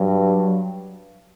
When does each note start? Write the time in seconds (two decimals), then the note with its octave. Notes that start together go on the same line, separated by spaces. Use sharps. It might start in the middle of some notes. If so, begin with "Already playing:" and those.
Already playing: G2 F#3